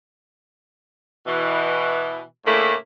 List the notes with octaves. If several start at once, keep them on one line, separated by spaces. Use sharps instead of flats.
B2 E3
A2 C#3 A3 A#3 D4 E4